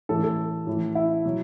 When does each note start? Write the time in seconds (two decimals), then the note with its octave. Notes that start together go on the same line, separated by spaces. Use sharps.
0.09 A2 E3 A4
0.24 A4
0.67 A2 E3
0.95 E4
1.25 B2 F#3